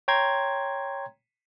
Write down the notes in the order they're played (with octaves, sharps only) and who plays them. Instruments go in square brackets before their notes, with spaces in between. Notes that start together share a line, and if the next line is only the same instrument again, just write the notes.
[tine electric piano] C#5 G5 A#5 C6 G#6